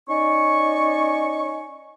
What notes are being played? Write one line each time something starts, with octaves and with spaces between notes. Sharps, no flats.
C#4 D#4 D5 G#5 C#6